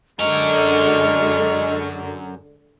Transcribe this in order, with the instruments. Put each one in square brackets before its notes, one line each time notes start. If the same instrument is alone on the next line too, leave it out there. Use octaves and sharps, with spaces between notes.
[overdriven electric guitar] F#2 A#4 [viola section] D3 G#3 [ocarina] D#5 [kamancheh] C#6 F6